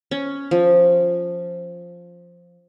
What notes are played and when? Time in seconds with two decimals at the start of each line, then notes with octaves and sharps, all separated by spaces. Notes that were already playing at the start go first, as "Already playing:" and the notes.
0.11 C#4
0.51 F3